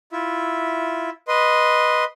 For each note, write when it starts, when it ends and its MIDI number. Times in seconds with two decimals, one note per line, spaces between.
0.12 1.10 64
0.12 1.10 65
0.12 1.10 76
1.28 2.04 71
1.28 2.04 75
1.28 2.04 84